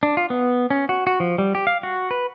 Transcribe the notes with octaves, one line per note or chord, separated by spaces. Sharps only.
D4
F4
B3
C#4
F#4
F#4
F3
G3
G4
F5
F#4
B4